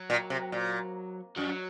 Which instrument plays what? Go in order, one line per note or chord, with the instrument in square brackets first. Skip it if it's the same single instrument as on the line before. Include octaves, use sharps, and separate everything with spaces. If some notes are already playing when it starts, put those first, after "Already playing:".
Already playing: [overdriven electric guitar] F#3
[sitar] A#2
C3
A#2
[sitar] F#2 [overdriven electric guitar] F#3